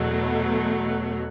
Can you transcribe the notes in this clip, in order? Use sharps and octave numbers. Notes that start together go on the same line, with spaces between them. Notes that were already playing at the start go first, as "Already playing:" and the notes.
Already playing: E2 B2 F#3 A3